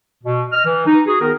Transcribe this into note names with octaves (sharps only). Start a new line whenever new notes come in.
B2
D#5 F6
E3
D#4
F#4 G#4
D#3 B3 D#4 A#4